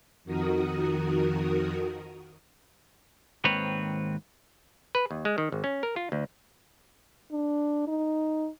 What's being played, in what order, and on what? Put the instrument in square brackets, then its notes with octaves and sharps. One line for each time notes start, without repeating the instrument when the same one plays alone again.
[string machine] F2 D#3 F#4 A#4 D#6
[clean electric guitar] D#2 G#2 D#3 C4 B4 C#5
[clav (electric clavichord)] B4
D#2
G#3
D#3
G#1
C#4
A#4
F4
D2
[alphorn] D4
D#4